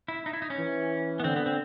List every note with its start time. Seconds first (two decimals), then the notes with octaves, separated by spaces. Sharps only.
0.08 E4
0.26 D#4
0.33 E4
0.42 D#4
0.50 C#4
0.59 E3
1.20 B3
1.24 D3 C4
1.36 B3
1.46 C4